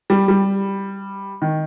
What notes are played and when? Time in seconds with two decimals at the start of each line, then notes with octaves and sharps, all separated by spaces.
0.10 G3
0.28 G3
1.42 D#3